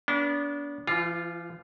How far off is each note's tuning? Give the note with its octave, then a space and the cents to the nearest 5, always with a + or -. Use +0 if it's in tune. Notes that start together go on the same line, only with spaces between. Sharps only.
B3 -30 D4 -35
E3 +45 F4 +0